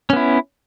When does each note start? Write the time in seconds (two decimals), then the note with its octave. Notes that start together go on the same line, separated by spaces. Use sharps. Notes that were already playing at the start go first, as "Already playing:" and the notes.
0.10 C#4
0.13 B3
0.16 E4